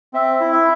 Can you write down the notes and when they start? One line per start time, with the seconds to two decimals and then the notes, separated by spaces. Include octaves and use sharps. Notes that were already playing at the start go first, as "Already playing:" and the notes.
0.14 C4 E5
0.40 E4
0.52 E5